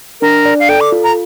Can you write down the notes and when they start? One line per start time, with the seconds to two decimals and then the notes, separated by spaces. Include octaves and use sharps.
0.21 D4 A#4
0.45 D5
0.60 F5
0.69 A4 G5
0.81 D6
0.92 F4
1.04 A#5